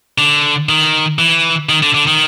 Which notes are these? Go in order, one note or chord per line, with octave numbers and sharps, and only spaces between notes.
D3
D#3
E3
D#3
D3
D3
D#3